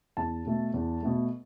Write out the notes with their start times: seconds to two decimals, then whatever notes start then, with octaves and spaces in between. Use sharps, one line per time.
0.17 E2 A5
0.46 B2 A3
0.74 E2
1.03 B2 A3